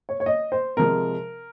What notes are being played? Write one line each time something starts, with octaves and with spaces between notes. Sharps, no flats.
C#5
C#5
D#5
C5
C3 F3 G#3 A#4